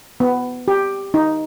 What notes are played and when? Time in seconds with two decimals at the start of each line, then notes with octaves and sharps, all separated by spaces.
0.20 B3
0.68 G4
1.14 D#4